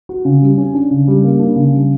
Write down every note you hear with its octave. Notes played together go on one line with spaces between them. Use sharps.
F#4
C#3
G3
C#4
D4
C#3
G3
A#3
D4
C#3
G3